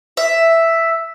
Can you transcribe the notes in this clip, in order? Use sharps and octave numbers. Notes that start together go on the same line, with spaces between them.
E5